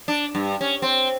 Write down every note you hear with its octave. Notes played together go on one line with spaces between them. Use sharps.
D4
G2
C#4
C4